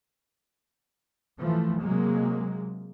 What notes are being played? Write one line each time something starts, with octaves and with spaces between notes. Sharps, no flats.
E3 F3 A3
C3 F#3 G#3 A#3